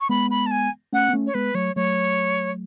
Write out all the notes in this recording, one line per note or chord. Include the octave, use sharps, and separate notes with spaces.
C#6
G#3 B3 B5
B5
A5
G#5
A3 C#4 F#5
B3
A3 C#4
C#5
G#3 B3 B4
F#3 A3 C#5
F#3 A3 C#5